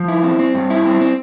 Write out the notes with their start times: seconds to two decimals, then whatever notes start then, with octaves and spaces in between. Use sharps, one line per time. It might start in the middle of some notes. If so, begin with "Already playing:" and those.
Already playing: F3
0.08 E4
0.24 C4
0.39 C4
0.54 G2
0.70 E4
0.86 C4
1.01 C4